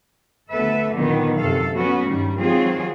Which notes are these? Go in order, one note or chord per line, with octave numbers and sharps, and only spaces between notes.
D2 B3 A4 B4 E5
A#2 D3 D#3 F#3 B3
F#2 C3 A4 F5
F#3 B3 C#4 F#4
G2 D#3 G3
D#3 F#3 G#3 C4 F4 G#4